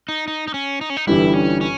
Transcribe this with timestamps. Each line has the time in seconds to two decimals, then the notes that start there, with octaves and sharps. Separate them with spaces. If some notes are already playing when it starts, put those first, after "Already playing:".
0.09 D#4
0.28 D#4
0.48 D#4
0.54 C#4
0.81 D#4
0.90 C#4
0.97 D#4
1.07 G1 G2 E3 G3 E4
1.34 C#4
1.61 C#4